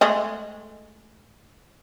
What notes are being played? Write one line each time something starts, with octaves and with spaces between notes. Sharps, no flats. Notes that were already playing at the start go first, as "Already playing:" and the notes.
G#3 A3 D#5